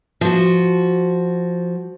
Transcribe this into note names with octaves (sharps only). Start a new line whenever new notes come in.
F3 F#4